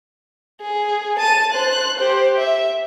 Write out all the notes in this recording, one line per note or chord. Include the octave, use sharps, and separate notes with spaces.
G#4
A5 D#7
C5 F#6
G4 C5
E5